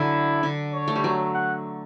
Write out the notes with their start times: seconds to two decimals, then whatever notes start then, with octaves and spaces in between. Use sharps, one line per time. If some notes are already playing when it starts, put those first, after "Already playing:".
Already playing: D3 F#3 E4
0.43 D3
0.73 C#5
0.88 A3
0.95 G3
1.04 F#3
1.34 F#5